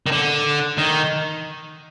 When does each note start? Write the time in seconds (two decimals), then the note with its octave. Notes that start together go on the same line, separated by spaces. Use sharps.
0.06 D#3
0.11 D3
0.78 D#3